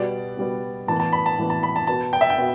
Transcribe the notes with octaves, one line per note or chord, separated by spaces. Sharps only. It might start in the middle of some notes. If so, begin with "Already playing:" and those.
Already playing: B2 G3 B3 D5
B2 G3 B3
A2 E3 B3 A5
A5
B5
A5
A2 E3 B3
A5
B5
A5
B2 B3 A5
G5
E5
G5
B2 B3